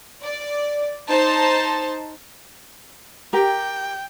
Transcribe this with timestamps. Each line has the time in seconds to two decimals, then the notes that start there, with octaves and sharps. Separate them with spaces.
0.24 D5
1.09 D#4 C5 A5
3.33 G4 A#4 G5